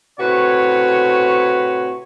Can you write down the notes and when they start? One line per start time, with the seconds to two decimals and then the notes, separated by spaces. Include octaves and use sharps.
0.19 A2 C3 F#4 B4 C#5